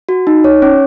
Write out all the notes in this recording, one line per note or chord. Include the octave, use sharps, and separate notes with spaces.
F#4
D#4
C#5
C#4